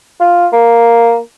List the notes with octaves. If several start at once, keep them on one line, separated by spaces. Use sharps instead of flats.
F4
A#3